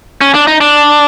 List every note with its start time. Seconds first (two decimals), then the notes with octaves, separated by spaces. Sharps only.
0.21 C#4
0.34 D4
0.47 D#4
0.61 D4